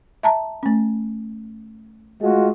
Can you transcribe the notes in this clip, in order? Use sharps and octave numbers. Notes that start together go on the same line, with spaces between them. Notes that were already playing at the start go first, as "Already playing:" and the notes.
E5 A5 A#5
A3 C#4
G#3 A3 F4 F#4